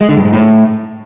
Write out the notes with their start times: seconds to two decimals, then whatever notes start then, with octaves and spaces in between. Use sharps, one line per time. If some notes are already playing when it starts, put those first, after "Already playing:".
0.01 G#3
0.09 D3
0.17 G2
0.25 G#2
0.33 A2